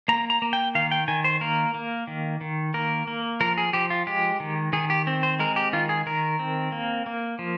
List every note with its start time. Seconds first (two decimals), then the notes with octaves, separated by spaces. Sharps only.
0.08 A#3 A#5
0.30 A#5
0.42 A#3
0.53 G5
0.75 D#3 F5
0.91 G5
1.08 D#3 G#5
1.24 C5
1.41 A#3 A#4
1.74 A#3
2.07 D#3
2.41 D#3
2.74 A#3 A#4
3.07 A#3
3.40 F3 A#4
3.58 G#4
3.73 F3 G4
3.90 F4
4.07 G#3 G4
4.40 D#3
4.73 D#3 G#4
4.90 G4
5.07 C4
5.23 C5
5.39 G#3 A#4
5.56 G4
5.73 D#3 F4
5.89 G#4
6.06 D#3 A#4
6.39 C4
6.72 A#3
7.06 A#3
7.39 F3